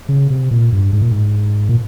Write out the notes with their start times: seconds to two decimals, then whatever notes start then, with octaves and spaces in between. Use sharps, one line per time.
0.09 C#3
0.30 C3
0.51 A#2
0.72 G2
0.93 G#2
1.02 A#2
1.11 G#2
1.69 A#2